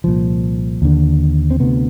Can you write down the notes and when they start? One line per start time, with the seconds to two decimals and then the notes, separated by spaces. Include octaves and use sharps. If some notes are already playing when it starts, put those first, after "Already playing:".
0.04 C2 A#2 F3
0.82 D#2 D3
1.50 C4
1.60 D2 C3 B3